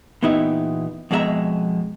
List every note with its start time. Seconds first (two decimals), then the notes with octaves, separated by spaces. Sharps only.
0.23 A#2 E3 B3 D#4 G4 E5
1.11 F2 B2 G#3 D#4 E5 A#5